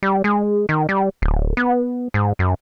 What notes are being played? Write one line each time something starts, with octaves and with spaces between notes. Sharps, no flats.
G3
G#3
D#3
G3
D1
B3
G#2
F#2